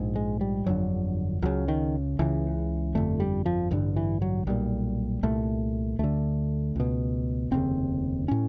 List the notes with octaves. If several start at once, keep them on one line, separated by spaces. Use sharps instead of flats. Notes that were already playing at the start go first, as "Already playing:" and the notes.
Already playing: A#1 G#2
G#3
G3
G1 F2 D3 F#3
C#2 C#3 F#3
D#3
C#2 C#3 E3
G1 F2 D3 A3
G3
F3
A1 G2 D3 F3
E3
F#3
B1 A#2 G3
C2 A#2 A3
D2 D3 A3
C#2 B2
F1 D#2 C#3 C4
A2 C#4